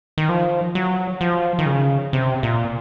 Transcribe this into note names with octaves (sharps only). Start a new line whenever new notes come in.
D#3
F3
F#3
F3
D#3
C#3
C3
A#2